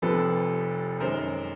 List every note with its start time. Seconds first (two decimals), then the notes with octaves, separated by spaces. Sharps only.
0.02 F1 F2 C3 F3 A4 B4
1.00 F#2 D#3 G#3 A#4 C5